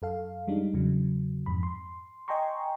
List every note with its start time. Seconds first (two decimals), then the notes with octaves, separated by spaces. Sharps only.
0.02 F#2 A4 F5
0.48 G3 G#3 D4 D#4
0.74 E2 C#3 F#3
1.46 F2 G#2 B5
1.63 C6
2.28 D#5 G5 G#5 A#5 C6 C#6